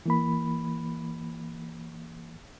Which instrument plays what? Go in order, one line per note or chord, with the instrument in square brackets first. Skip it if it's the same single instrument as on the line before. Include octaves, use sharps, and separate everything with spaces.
[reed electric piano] E3 A#3 B5